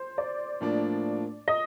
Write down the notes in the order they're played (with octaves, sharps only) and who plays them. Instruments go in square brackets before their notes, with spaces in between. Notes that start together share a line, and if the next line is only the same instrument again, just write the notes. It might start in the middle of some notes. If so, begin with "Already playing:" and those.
Already playing: [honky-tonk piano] C5
D5
[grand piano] A2 F3 A#3 D4
[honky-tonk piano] D#5